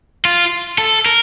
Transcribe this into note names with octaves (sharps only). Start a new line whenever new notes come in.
F4
A4
A#4